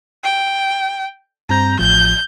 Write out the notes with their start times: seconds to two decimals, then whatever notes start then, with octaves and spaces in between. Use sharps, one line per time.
0.24 G5
1.49 G2 C4 A#5 G6
1.79 A1 F3 G6